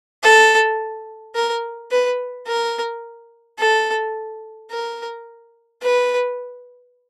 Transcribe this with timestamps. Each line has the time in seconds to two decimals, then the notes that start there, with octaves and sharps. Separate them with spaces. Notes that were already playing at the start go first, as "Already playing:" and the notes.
0.23 A4
1.35 A#4
1.91 B4
2.47 A#4
3.59 A4
4.71 A#4
5.82 B4